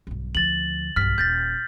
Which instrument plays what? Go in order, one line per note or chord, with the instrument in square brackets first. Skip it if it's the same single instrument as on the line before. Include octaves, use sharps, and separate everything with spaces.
[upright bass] B1 G2
[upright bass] D2 F3 [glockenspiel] A6 F#7
[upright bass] B1 G2 [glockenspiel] F6 B6
[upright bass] D#1 [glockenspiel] G6 A6 A#6